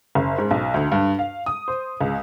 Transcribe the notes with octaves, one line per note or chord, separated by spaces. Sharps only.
F#1
G#2
B1
D2
G2
F5
D#6
C5
C#2